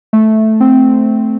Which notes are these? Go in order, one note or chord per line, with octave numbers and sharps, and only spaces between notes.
A3
C4